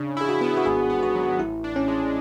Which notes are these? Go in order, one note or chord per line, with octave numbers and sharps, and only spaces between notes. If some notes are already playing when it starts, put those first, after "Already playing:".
Already playing: C#3 D4
E4 G#4
F#4
B3
F#4
G#1 G#4
B3
F#4
F#3
A1 E4
D4
C#4
G#3